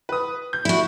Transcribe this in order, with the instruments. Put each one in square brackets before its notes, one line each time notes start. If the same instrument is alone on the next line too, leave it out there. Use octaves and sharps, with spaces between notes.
[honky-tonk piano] B4 D#6
G6
[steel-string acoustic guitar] E4 F#4